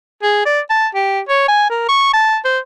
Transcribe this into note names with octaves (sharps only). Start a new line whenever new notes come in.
G#4
D5
A5
G4
C#5
G#5
A#4
C#6
A5
C5